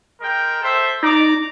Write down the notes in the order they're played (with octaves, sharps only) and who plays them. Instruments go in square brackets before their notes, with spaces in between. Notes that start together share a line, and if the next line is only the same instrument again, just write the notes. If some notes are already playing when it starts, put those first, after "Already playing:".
[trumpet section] G#3 A#4 G5
A4 C5 E5
[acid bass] D#4 [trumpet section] D5 A#5 D6